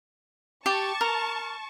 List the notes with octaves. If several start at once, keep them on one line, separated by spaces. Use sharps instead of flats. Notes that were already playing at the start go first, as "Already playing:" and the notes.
G4 A5 C#6
A#4